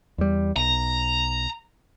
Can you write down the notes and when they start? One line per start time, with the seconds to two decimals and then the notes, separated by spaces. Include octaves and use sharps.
0.18 E2 G3
0.56 B1 A#5